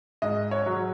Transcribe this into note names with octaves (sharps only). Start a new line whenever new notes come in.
G#2 D#5
C#5
F#3